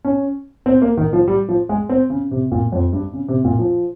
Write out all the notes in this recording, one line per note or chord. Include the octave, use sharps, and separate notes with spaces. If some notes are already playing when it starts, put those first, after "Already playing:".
C#4
C4
A#3
D#3
F3
G3
F3
G#3
C4
C#3
C3
A#2
F2
G2
C#3
C3
A#2
F3